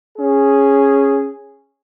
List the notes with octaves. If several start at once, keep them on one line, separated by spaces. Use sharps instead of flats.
C#4 G#4